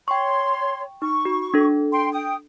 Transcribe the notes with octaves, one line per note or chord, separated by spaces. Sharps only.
C#5 G5 C6 C#6
D#4 C#6
F#4
D4 A4
G5 C6
G5 D#6